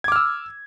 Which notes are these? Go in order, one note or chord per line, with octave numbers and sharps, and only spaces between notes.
D6 E6 F6 G#6